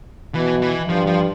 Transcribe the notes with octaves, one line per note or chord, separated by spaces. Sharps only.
B2 E3
E3
G2 F3
F3